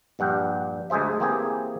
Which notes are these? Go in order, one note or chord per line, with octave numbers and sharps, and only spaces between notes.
A#1 G2 F#5 G5
D2 G#3 G#4 C5 E5
E3 A#3 C4 G4 G#4